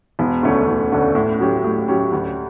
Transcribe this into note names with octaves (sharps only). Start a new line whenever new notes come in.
E1
D2 D3 A3 C#4
E1
D2 D3 A3 C#4
A2
F#3 C#4 G4
A2
F#3 C#4 G4
D2